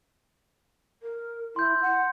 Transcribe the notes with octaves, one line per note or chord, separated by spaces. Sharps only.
A#4
E4 C6 G6
F#5